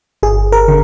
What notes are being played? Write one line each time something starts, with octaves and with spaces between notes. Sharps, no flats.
G1 G#4
A#4
D3